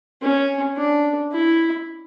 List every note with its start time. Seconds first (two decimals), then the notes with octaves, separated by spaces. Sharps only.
0.22 C#4
0.76 D4
1.32 E4